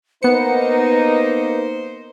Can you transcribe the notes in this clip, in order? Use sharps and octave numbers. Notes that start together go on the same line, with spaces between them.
A#3 B3 D#4 B4 C5 C#7